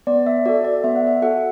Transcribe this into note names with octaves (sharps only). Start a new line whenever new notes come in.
B3 D5
E5
F#4 A4 D5
D5
B3 E5
F#5
E5
F#4 A4 F#5